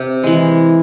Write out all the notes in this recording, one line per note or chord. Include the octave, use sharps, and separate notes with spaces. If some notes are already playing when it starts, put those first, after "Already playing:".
Already playing: C3
E3 G#3